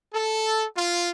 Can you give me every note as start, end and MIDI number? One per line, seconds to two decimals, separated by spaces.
0.14 0.64 69
0.76 1.10 65